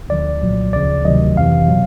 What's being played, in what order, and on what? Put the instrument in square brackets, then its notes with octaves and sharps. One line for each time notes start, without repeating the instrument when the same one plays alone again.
[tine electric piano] D2 D3 F3 D5
C2 A#2 F#3
D2 C#3 F3 D5
D2 C3 D#3 F#3 D#5
F2 C3 E3 F5
B2 F#3